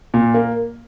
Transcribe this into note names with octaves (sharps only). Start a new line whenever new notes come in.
A#2
A#3